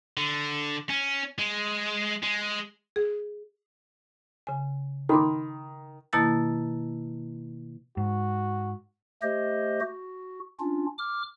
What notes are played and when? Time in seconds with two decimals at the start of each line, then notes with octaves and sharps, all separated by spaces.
0.17 D3
0.89 C#4
1.39 G#3
2.23 G#3
2.96 G#4
4.47 C#3 G#5
5.09 D#3 B5 C6 D6
6.13 B2 D#3 A#3 E4 A5 A6
7.97 G#2 F#4
9.22 A3 G4 C5 D#5
9.80 F#4
10.60 C#4 D4 F4
10.99 D6 F6